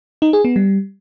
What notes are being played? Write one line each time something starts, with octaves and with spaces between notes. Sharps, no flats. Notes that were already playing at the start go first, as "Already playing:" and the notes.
D#4
G#4
B3
G3